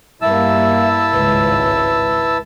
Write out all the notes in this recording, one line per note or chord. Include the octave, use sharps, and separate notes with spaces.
G2 A#3 E4 E5 A5 E6
G#1 C#2 B4